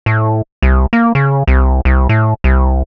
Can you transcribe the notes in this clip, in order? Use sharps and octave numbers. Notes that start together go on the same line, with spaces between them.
A2
C2
A#3
C#3
C2
C2
A2
C2